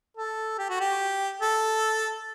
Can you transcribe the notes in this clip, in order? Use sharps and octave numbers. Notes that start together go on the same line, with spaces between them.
A4
G4
F#4
G4
A4